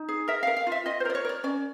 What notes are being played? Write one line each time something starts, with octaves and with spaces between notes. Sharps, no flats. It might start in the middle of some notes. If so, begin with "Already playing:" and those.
Already playing: D#4
G#4
A#4 E5
F5
A#4
F5
F4 E5
F4 D#5
C5
A#4 D5
C#5
A#4 D5
C#4 D5